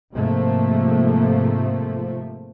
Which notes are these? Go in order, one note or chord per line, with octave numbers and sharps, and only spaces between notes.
G#2 C3 F3 A3 A#3